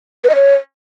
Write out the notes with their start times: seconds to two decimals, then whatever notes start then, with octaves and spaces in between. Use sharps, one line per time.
0.24 B4
0.30 D#5
0.35 C#5